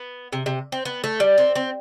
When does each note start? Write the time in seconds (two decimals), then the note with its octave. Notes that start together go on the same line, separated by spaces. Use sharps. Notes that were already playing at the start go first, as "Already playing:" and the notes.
Already playing: B3
0.33 C3
0.46 C3
0.72 C4
0.85 B3
1.04 A3
1.20 G3
1.38 C4
1.55 C4